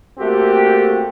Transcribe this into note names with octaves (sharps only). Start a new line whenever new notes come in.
A3 A#3 C4 F#4 G4